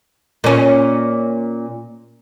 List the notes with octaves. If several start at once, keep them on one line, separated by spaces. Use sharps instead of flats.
A#2 C#4